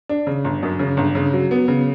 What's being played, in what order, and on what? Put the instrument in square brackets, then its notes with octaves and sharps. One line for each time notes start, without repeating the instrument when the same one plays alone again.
[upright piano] D4
C#3
G1
F#2
C#3
G1
C#3
F#3
B3
C#3